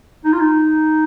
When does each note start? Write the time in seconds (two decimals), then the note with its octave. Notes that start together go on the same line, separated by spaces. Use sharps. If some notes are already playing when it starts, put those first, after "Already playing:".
0.25 D#4
0.33 F4
0.40 D#4